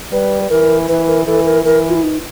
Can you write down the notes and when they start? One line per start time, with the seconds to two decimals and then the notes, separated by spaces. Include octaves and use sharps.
0.12 G3 B4
0.50 E3 A#4
0.88 E3 B4
1.07 A#4
1.27 E3 A4
1.45 A#4
1.65 E3 A#4
1.89 F4
1.95 E4
2.03 D#4